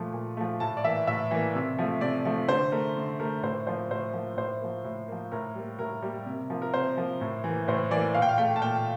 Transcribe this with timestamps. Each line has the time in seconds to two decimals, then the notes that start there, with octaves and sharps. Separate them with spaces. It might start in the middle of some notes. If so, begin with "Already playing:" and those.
Already playing: A#2 F3 A3
0.13 A#2
0.37 F3 A3
0.60 A2 A5
0.77 D5
0.84 E3 A#3 E5
1.07 A2 E5
1.31 E3 A#3
1.55 C3
1.78 F3 A3
2.01 C3 D5
2.25 F3 A3
2.48 D3 C5
2.72 A3 A#4
2.96 D3
3.20 A3 A#4
3.43 A2 C5
3.67 F3 A#3 C5
3.90 A2 C5
4.13 F3 A#3
4.37 A2 C5
4.61 F3 A#3
4.84 A2
5.08 F3 A#3
5.32 A2 A#4
5.55 G3 A#3
5.79 A2 A#4
6.03 G3 A#3
6.26 C3
6.50 F3 A#3
6.62 A#4
6.74 C3 C5
6.97 F3 A#3
7.21 A2
7.44 E3 A#3
7.68 A2 C5
7.91 E3 A#3 D5
8.14 A#2 F5
8.22 G5
8.29 F5
8.38 A3 G5
8.56 A5
8.62 A#2 G5